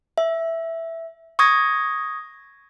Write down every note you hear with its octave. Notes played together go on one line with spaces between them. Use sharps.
E5
C#6 D#6 G#6 A#6